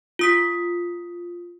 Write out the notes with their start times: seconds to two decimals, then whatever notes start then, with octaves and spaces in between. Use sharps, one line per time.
0.19 F4 D#6 B6